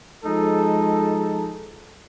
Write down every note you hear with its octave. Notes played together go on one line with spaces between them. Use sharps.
F3 G#3 D#4 A4